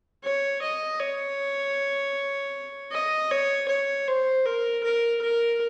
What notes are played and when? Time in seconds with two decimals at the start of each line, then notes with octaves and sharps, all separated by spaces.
0.24 C#5
0.62 D#5
1.00 C#5
2.92 D#5
3.31 C#5
3.68 C#5
4.08 C5
4.45 A#4
4.83 A#4
5.21 A#4